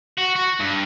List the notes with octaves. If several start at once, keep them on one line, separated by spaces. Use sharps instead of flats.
F#4
F#4
G2